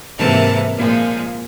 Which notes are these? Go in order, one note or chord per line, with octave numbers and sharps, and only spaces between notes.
G#2 C3 E3 A#3 A#4 A5
A#2 F3 G#3